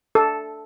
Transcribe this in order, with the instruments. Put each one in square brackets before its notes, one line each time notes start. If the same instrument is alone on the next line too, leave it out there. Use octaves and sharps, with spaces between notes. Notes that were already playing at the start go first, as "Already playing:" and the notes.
[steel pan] A4